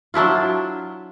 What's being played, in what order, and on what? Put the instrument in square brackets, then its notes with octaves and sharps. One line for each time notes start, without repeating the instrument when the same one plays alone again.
[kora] F#3 D4 E4 F4